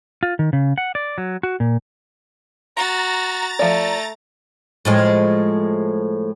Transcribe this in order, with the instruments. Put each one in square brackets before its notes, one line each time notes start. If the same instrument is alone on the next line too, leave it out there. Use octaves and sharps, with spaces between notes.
[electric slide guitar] F4
D#3
C#3
F#5
D5
F#3
F#4
A#2
[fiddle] F#4 [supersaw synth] A#5 A6
[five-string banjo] F3 D5 [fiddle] A3
[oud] A2 F3 G#3